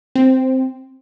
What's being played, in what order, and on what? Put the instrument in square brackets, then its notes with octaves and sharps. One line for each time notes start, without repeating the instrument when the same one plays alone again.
[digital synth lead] C4